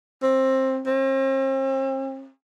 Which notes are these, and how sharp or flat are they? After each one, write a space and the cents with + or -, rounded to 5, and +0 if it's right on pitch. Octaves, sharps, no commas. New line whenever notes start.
C4 +15
C4 +40